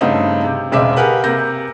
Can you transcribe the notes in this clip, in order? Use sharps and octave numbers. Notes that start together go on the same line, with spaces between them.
G2 C#3 A3 C4 D#4
C3
E1 C#3 G#3 C4 E5 D6
G4 G#4 A#4 B4 F#5
C3 A#3 G6 A#6